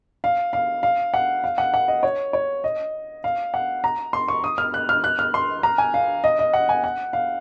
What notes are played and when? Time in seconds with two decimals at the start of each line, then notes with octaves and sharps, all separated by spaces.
0.24 F5
0.53 F5
0.83 F5
1.14 F#5
1.44 F5
1.58 F#5
1.74 F#5
1.88 D#5
2.03 C#5
2.33 C#5
2.64 D#5
3.24 F5
3.54 F#5
3.84 A#5
4.13 C6
4.28 C#6
4.44 D#6
4.58 F6
4.74 F#6
4.89 F6
5.04 F#6
5.19 F6
5.34 C6
5.63 A#5
5.78 G#5
5.94 F5
6.24 D#5
6.39 D#5
6.53 F#5
6.69 G#5
6.84 F#5
7.13 F5